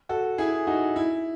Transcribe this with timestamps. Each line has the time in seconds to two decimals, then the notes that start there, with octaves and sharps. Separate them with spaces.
0.09 F#4 A4
0.38 E4 G#4
0.67 D#4 F#4
0.96 E4